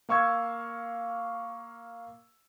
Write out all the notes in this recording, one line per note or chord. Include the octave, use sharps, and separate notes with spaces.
A#3 F5 C#6 E6 G#6